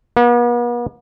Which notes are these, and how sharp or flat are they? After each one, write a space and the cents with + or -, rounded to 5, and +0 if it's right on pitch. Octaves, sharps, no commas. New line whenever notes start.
B3 -45